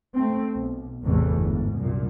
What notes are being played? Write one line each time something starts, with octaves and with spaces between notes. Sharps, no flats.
A3 C4
B1
A1 E2 C3 E3 A3
G1 G#2
C2 F#2 A#2